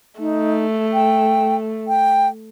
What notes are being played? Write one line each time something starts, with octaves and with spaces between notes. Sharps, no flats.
A3 D#4
G5
G5